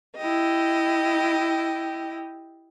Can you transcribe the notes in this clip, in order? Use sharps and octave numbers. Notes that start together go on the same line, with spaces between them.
E4 G4 D#5